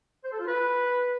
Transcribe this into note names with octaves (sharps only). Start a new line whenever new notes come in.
C5
A4
F4
B4